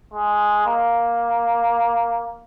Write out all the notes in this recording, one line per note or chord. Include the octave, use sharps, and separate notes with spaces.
G#3
A#3